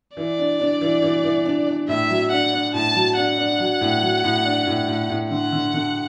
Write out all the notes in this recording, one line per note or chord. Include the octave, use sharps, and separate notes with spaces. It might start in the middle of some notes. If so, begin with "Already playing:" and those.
E3 D5
D4
D4
E3
E3
E3
D4
D4
A2 E5
F#3
D4 F#5
D4
A2 A5
F#3
D4 F#5
D4
F#3
A2
F#3
A2
D4
A2
A2
A2
D3 F#5
D3
D3